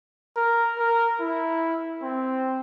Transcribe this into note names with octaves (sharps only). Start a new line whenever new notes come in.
A#4
A#4
E4
C4